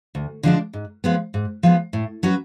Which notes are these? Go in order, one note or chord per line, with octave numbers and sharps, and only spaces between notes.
D2
D3 F3 G#3 D4
G#2
F3 G#3 B3
G#2
F3 G#3 B3
A2
F#3 C#4 F#4 B4